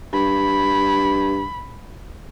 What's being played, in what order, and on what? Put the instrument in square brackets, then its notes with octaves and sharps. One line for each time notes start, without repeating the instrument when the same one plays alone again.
[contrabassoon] G2 [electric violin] B5